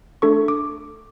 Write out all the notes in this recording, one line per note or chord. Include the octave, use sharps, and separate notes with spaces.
A3 D4 A4 C#6
D6